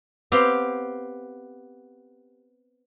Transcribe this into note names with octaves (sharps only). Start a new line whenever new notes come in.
B3 C4 G4 F5